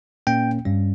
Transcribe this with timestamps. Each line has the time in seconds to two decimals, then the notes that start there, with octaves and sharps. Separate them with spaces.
0.27 A#2 A#3 C#4 G5
0.65 G2 G3 C#4